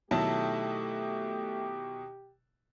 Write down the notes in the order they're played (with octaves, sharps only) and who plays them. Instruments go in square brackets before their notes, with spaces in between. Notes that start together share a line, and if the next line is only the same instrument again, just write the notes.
[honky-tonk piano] B2 D#3 F#3 [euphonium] A3 [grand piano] E4 A5 [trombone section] G4